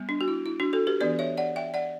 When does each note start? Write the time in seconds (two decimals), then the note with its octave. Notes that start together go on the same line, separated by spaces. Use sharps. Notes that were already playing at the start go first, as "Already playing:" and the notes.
Already playing: G3 B3
0.09 D4
0.21 F#4
0.28 E4
0.46 E4
0.60 D4 F#4
0.73 F#4 A4
0.87 G4 B4
1.00 E3 B3 D4 B4 D5
1.19 C#5 E5
1.38 D5 F#5
1.56 E5 G5
1.74 D5 F#5